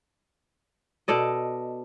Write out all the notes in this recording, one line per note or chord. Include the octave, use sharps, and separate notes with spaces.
B2 A4 D5 D#5